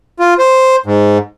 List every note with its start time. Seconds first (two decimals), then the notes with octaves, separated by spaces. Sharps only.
0.20 F4
0.39 C5
0.86 G#2